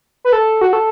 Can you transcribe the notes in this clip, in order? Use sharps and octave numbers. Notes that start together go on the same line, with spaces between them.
B4
A4
F#4
A4